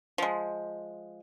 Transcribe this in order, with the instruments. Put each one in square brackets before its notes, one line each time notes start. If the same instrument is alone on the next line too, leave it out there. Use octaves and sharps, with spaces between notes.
[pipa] F3 G#3